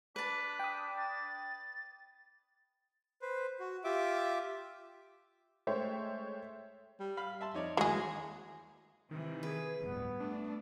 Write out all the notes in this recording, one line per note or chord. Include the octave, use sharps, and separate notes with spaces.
D4 B4 A5 B6
G5 D#6
A6
B4 C5
F#4
F4 G4 E5 D6
G#3 A3 C5 C#5 E5 G5
G3
F5 B5
E5 A5 C6
F2 D#4 C#5 D5
D#2 E3 F#3 G#3 G#4
C3 D#3 E3
G#4 B4
D1 G2 B3
A3 D4